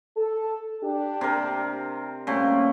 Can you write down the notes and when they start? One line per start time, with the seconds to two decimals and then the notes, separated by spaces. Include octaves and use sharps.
0.16 A4
0.83 D4 G4
1.21 C3 A#4
2.27 A#2 G3 A3 C4 C#4